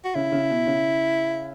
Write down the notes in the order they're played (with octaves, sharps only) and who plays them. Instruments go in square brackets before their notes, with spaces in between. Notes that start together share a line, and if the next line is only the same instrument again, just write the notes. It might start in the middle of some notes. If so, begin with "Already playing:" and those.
[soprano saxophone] F#4
[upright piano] C#3 [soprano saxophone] E4
[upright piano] C#3
B2
C#3